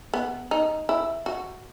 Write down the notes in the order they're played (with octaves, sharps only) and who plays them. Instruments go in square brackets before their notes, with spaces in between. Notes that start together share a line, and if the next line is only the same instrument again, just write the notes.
[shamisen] B3
D#4
E4
F#4